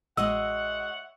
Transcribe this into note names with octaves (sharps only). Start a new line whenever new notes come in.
A1 G#3 F#4 C#5 D#5 E5 F#5 E6